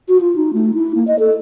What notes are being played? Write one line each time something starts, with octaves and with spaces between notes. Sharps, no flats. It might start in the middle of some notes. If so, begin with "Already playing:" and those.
F#4
F4
D#4
A3
E4
A#3
D#5
A4